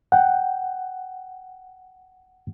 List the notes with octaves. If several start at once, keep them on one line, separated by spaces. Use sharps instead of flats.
F#5 G5